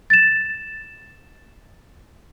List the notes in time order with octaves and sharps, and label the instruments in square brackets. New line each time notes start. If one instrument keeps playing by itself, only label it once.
[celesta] A6 E7